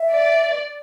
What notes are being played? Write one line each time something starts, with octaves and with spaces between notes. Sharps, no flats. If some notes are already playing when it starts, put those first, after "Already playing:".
Already playing: E5
D5